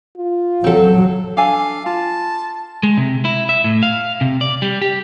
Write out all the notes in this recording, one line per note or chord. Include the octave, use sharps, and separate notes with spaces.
F4
F#3 C4 A4
D4 A4 F5 G#5
F4 A5
G#3
C3
E4
E5
A2
F5
C3
D5
G3
G4